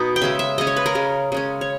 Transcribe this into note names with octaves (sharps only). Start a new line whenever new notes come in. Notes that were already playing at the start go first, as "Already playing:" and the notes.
Already playing: B2 B3 D#4
G5
C#3 G#3 C#4 E5
E5
C#3 G#3 C#4 D#5
C#5
B4
A#4
C#3 G#3 C#4
C#3 G#3 C#4
C#5